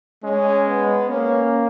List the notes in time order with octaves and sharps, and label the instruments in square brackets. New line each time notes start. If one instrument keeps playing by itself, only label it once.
[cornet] G#3 [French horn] C#4
[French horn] B3
[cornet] A#3 [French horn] C#4